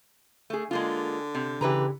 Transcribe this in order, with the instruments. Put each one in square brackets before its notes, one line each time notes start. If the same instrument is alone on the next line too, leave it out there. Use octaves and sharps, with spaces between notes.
[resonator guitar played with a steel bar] A3 G#4
[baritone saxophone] D3 [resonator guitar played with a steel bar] G#3 A#3 F4
[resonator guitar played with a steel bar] C3
[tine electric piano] C#3 G4 [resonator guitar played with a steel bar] E3 B4 A#5